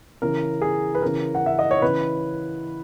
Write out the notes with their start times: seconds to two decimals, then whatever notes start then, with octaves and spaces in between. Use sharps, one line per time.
0.22 C#3 E3 A#4
0.62 G#4
0.95 B4
1.02 C#3 E3 A#4
1.35 F#5
1.46 E5
1.59 D#5
1.71 C#5
1.82 C#3 E3 B4